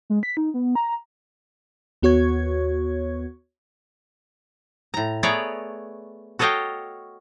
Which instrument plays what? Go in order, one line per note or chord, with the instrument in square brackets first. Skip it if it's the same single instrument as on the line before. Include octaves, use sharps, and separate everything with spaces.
[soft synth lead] G#3
B6
D#4
B3
A#5
[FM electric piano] D#2 B3 F#4 C#5 C#6 G#6
[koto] A2 A#5
A3 B3 G#4 C#5 D5 A#5
F#4 A4 C#5 D#5 F5 G5